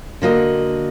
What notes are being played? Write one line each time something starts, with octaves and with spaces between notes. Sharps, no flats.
D3 A#3 F#4 D#5